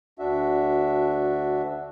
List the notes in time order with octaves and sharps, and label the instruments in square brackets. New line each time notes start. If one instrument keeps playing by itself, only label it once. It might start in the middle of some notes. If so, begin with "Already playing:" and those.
[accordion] D2 D4 F#4 E5